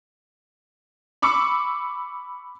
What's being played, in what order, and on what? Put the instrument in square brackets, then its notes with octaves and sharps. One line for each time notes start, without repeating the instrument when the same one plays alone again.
[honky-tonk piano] B5 C#6 D6 E6 C#7